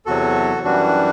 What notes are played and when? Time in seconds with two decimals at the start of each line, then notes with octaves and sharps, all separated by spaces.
0.06 E2 C3 F#3 F#4 A4
0.65 F#2 E3 G3 D4 F#4